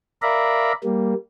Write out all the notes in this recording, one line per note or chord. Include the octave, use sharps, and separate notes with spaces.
A#4 D5 E5 F5 A#5 B5
G3 A#3